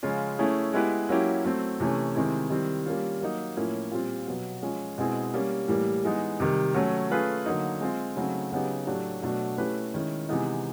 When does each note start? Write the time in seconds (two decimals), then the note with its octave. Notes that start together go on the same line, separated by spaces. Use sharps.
0.03 C#3 F3 G#3 C#4 F4
0.39 A3 C#4 E4 G#4
0.73 G#3 B3 E4 G4 B4
1.09 F#3 A#3 C#4 E4 G4
1.45 F#3 A3 C4
1.80 C3 E3 A3 C#4
2.15 C3 D#3 G#3 C4 E4
2.50 D#3 G3 C4 E4
2.86 G3 A#3 C#4 F4
3.21 F#3 A#3 D#4
3.57 A2 F3 A#3 C#4 E4
3.91 A#2 G3 C4 F4
4.27 B2 F#3 B3
4.62 F3 G#3 C#4
4.98 B2 G#3 C4 E4 G#4
5.34 G3 A#3 C#4
5.68 A2 E3 G3 A#3
6.04 E3 G#3 B3 D#4
6.40 C3 D#3 G3
6.75 F#3 A3 C#4
7.11 A3 C#4 F4 G#4 B4
7.46 D3 F#3 A#3 D#4
7.81 G#3 C4 F4
8.16 C#3 F#3 A3 C4 D#4
8.52 C#3 F#3 B3 D#4 G4
8.87 A2 F#3 A3 D4 G4
9.22 B2 F#3 A3 D4 F#4
9.58 A3 C#4 E4 G4 B4
9.94 D#3 G#3 C#4 E4
10.29 C3 E3 G#3 B3 D#4